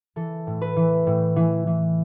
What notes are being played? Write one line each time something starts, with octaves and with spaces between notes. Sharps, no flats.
E3 A4
A2
B4
E3
A2
E3
E3